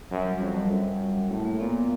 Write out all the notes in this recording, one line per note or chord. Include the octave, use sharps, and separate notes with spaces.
F#2 F#3
G3
F2 F#3
G3
F#2
A2 A3
A#3
A#2 B3